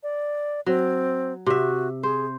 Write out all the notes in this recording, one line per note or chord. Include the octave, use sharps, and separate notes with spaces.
D5
F#3 C4
C3 F#4 E5
G#4 C5